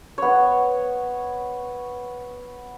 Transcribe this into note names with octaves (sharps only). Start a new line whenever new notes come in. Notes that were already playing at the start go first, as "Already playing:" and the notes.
B3 C#5